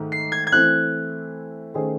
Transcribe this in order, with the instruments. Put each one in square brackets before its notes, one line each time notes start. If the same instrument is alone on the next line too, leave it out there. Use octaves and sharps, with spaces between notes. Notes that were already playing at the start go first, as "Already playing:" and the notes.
Already playing: [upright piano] G#2 D#3 A3
[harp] C7
G#6
G#6
[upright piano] E3 A3 C4 E4 [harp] F#6
[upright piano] D#3 A3 C#4 G#4 C5